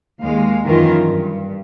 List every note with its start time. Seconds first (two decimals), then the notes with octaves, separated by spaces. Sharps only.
0.21 D#2 G#3 F5
0.67 F#2 D#3 E3 F4 A#4
1.05 G2